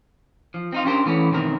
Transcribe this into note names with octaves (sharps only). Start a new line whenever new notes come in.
F3
C4 D#4 F4
C#4 D4 G4 A#4 C5
E3 A3 B3 C#4
B1 F#2 D#3 C4 A#4